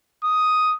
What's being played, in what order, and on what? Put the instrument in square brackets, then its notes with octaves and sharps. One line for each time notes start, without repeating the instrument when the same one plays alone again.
[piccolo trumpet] D#6